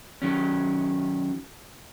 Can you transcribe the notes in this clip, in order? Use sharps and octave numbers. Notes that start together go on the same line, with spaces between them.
D#3 F#3 C#4